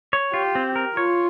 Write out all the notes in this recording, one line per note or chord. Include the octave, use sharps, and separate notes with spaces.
C#5
F4 G4
C4
A#4
F4 C#5